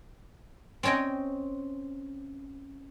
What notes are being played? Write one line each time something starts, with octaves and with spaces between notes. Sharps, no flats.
C4 C#4 C#5 D#5 G5